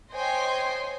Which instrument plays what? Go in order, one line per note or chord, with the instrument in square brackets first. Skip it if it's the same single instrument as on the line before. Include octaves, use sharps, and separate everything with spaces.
[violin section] C5 C#5 D#5 G5 G#5 C6